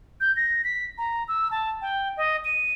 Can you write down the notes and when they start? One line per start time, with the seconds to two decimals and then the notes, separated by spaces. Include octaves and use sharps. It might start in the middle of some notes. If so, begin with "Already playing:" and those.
0.21 G6
0.36 A#6
0.64 B6
0.98 A#5
1.28 E6
1.51 A5
1.82 G5
2.17 D#5
2.45 D#7